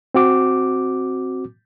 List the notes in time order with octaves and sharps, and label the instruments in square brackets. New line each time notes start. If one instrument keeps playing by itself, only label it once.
[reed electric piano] C4 F#4 D6